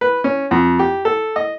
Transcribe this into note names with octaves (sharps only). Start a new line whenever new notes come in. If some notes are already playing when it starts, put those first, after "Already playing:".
B4
C#4
F2
G4
A4
D#5